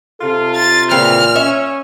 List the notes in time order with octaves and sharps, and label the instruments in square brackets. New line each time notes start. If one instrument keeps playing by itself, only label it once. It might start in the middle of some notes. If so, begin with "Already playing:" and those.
[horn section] C3 F4 [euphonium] A4
[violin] A6
[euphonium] A#2 [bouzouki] C#3 E3 C4 [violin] F6
[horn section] C#4 [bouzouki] E5